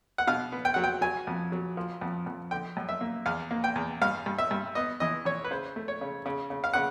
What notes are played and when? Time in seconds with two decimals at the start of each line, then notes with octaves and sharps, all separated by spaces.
0.18 F#5
0.27 B2 F5
0.52 B3
0.65 G5
0.74 F#3 F#5
0.84 G5
1.01 F#3 G#5
1.27 F2
1.52 F#3
1.77 F3
2.01 F2
2.26 F2
2.51 D3 G5
2.77 F#2
2.89 E5
3.01 A#3
3.26 E2 F5
3.51 A#3
3.64 G5
3.76 E2
4.02 G2 F5
4.26 G2
4.38 E5
4.51 G2
4.75 B3 D#5
5.00 E3 D#5
5.25 E3 C#5
5.44 B4
5.51 C#3 C5
5.76 A3
5.88 C#5
6.01 C#3
6.26 C#3
6.50 C#3
6.64 F5
6.73 C#3 F#5